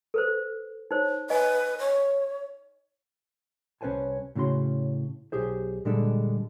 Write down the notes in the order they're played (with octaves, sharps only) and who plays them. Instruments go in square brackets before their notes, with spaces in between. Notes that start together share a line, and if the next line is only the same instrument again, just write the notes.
[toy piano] A4 B4 C5
D#4 C5 C#5
[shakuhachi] B4 [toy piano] D#5 G#5
[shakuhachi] C#5
[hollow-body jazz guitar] C2 C#4 B4 C5 G#5 A5
A2 C#3 C#4 F#4 C6
B1 G4 G#4 C5
A#2 D3 G3 G#3 D4 A4